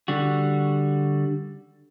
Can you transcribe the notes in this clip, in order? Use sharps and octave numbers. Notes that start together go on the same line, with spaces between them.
D3 G3 F#4